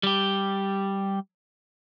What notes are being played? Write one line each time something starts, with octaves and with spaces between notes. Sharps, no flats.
G3 G4